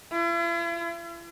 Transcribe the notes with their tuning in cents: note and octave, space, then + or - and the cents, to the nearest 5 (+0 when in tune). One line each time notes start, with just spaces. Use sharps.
E4 +45